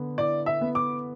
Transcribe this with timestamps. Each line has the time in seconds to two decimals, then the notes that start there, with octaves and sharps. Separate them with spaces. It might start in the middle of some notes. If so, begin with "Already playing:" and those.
Already playing: D3 B3
0.18 E4 D5
0.46 E5
0.61 B3
0.75 D6